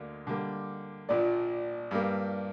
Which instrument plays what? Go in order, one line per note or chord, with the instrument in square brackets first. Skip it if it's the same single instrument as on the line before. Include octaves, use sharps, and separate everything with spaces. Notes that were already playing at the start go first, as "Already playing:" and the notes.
Already playing: [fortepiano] D2 D3 A#3
D3 G3 A#3
[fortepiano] A#1 A#2 F3 [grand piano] D5
[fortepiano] G2 G3 A#3